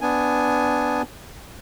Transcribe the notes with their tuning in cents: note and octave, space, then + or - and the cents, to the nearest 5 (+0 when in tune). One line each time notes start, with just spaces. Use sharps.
B3 +15 D4 +0 G#5 +0